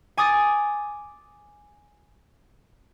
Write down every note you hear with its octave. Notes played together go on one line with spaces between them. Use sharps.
G#5 D6 D#6 A6